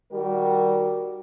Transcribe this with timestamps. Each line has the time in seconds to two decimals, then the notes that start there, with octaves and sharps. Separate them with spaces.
0.11 D#3 G3 F#4 A#4